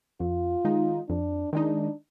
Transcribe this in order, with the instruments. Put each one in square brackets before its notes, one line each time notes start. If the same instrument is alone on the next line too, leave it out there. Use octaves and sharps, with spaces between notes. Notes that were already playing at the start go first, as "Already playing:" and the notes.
[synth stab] F2 [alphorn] F4
[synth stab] D#3 G#3 D#4
[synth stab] F2 [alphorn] D4
[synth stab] D#3 G#3 D#4 [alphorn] D4